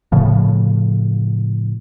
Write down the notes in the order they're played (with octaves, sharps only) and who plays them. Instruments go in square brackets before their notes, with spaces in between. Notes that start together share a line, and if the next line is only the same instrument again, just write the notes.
[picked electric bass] A2 C#3 F3